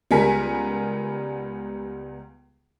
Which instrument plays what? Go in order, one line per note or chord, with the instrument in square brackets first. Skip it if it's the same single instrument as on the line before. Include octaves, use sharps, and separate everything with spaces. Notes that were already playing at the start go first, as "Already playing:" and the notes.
[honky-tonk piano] C#2 G3 B3 A#4 G#5 B6